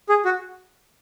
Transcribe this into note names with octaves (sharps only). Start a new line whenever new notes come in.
G#4
F#4